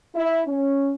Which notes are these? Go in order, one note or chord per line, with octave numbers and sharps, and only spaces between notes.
E4
C#4